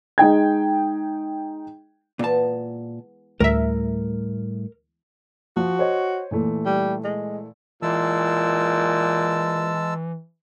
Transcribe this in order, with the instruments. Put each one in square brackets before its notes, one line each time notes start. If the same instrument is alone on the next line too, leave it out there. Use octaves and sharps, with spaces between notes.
[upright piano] G#3 D#4 G5 G#6
[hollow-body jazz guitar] A#2 A5 [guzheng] E3 G#3 B3
[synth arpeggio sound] D2 E5 [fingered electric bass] A2 G3 A3 [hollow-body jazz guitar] A#4
[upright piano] F3 [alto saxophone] F#4
[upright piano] C5 C#5 D#5
A#2 E3 A3
[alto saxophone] G3
G#3
[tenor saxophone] A#2 [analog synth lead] E3 [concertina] G#3 A5 E6